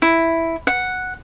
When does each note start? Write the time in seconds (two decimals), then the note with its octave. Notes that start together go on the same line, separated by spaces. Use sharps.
0.02 E4
0.67 F#5